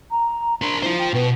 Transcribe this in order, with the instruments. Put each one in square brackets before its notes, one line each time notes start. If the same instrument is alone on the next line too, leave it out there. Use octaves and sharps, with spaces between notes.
[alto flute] A#5
[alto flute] D4 [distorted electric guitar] A#4 C5
[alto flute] E4 [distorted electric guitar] F4 C5
[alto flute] G5
[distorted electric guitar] B2 [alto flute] B4